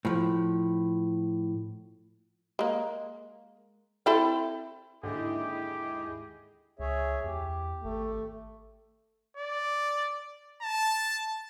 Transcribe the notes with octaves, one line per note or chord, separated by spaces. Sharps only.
A2 F3
G#3 A#3
C4 E4 A4
D#2 G#2 D3 E4 G4 G#4 D#5
C#2 G#4 C#5 E5
E2 G4
G#1 A3
D5
A5